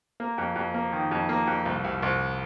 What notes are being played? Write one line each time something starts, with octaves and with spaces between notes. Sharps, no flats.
A#3
F2
F2
A#3
D#3
F2
A#3
F2
C2
C2
C2